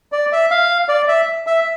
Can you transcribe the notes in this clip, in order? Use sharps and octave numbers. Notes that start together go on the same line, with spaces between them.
D5
E5
F5
D5
E5
E5